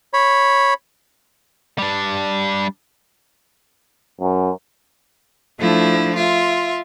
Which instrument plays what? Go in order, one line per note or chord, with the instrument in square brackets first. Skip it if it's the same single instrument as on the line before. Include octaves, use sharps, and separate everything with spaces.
[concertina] C#5 B5
[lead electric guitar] G3 D4
[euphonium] F#2
[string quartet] F3 A3 D4 E4
F4 E5